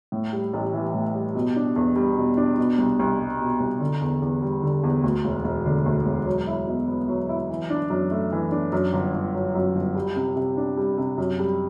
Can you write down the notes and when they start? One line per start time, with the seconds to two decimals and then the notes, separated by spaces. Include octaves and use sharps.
0.12 A2
0.33 G3
0.53 A1
0.74 E3
0.94 A2
1.15 G3
1.35 B2
1.56 D4
1.76 E2
1.96 G3
2.17 B2
2.37 D4
2.58 B2
2.78 C2
2.99 C2
3.19 G3
3.40 B2
3.60 C2
3.80 D3
4.01 E2
4.22 E2
4.42 G3
4.63 D3
4.83 E2
5.04 D2
5.25 E1
5.44 E1
5.66 D3
5.86 D2
6.06 E1
6.26 F#3
6.47 E4
6.67 B2
6.88 B3
7.09 F#3
7.29 E4
7.50 E3
7.70 D4
7.90 F#2
8.11 A3
8.32 E3
8.52 D4
8.72 F#2
8.93 G1
9.14 G1
9.35 F#3
9.55 F#2
9.75 G1
9.95 G3
10.16 C3
10.36 C3
10.57 D4
10.77 G3
10.98 C3
11.18 F#2
11.39 G3